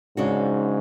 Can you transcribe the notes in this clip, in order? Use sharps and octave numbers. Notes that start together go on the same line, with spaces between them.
G#2 C#3 G#3 D4 F#4